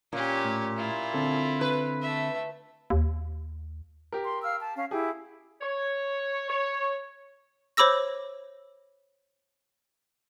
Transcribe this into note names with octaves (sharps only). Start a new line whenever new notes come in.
A#2 C#4 G4
A2
E4 F4
D3 C4 A4
B4
A3 E5
D#2
G4 A#4
C6
F5 E6 F6
A5
C#4 F5
E4 G4 G#4
C#5
C#5
C5 C#5 B5 D6 E6 A#6